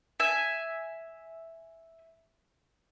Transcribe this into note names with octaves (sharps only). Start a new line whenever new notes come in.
E5 G#5